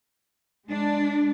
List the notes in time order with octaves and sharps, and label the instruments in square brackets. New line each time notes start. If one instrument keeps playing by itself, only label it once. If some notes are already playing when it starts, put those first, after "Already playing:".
[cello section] G#3 D4